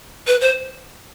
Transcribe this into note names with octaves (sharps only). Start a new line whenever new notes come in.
B4
C5